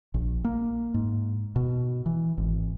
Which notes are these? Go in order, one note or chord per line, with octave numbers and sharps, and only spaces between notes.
A#1
A#3
G#2
B2
E3
G#1